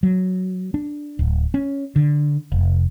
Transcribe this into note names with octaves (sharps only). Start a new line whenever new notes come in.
F#3
D4
D1
C#4
D3
F1